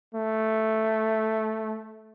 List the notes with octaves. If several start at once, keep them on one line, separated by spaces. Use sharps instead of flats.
A3